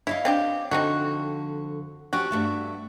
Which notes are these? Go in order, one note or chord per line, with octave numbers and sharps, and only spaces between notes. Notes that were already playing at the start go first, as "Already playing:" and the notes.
E4 C#5 D#5 F5
C4 D4 G4
F2 D3 C4 D#4 F#4
F3 C#4 F#4 G4
G2 A3 E5